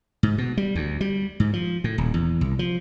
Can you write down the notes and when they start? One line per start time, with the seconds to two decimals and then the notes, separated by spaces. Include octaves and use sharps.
0.23 G#2
0.38 B2
0.57 G3
0.75 D2
1.01 G3
1.40 G#2
1.53 F3
1.84 A2
1.98 D#1
2.14 E2
2.41 C2
2.59 F3